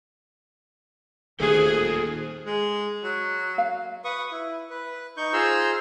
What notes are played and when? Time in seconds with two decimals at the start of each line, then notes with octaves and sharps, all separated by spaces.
1.40 D#1 D#2 A3 G#4 A4 C5
2.46 G#3
3.04 F#3
3.58 F5
4.04 B4 C#6 D#6
4.32 E4
4.70 B4
5.17 D#4 C#6 G6
5.33 F4 G#4 C5 A#5 C6 E6